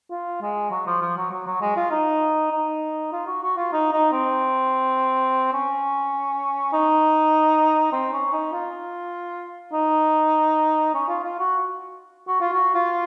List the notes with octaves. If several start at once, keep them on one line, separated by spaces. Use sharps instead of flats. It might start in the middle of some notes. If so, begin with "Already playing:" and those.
F4
G#3
F#3
F3
F3
F#3
F#3
F#3
G#3
F4
D#4
D#4
F4
F#4
F#4
F4
D#4
D#4
C4
C#4
D#4
C4
C#4
D#4
F4
D#4
C#4
F4
F4
F#4
F#4
F4
F#4
F4